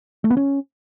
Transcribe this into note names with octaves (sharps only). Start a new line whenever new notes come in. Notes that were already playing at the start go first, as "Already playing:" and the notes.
A3
B3
C#4